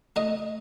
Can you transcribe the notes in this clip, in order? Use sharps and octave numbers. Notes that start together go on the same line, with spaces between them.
A3 D#5